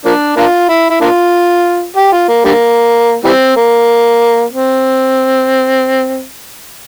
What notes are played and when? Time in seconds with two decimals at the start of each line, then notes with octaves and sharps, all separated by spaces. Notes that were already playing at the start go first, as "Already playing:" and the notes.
0.05 F3 A#3 D4
0.37 A#3 D4 F4
0.69 E4
0.90 E4
1.01 A#3 D4 F4
1.97 G4
2.12 F4
2.29 A#3
2.45 D3 G3 A#3
3.24 E3 G3 C4
3.56 A#3
4.53 C4